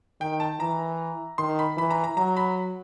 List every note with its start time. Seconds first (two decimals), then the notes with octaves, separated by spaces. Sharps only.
0.21 D#3 G5
0.40 A5
0.60 E3 A#5
1.38 D#3 C6
1.59 B5
1.77 E3 B5
1.91 A#5
2.04 A#5
2.17 F#3 A#5
2.37 B5